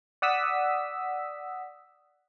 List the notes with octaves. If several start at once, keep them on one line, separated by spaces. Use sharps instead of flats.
D5 F#5 D#6 E6 B6